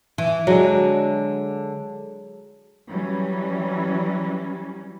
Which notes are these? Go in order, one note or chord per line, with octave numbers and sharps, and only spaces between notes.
E3
D3 F#3 G#3
E3 F#3 G3 C#4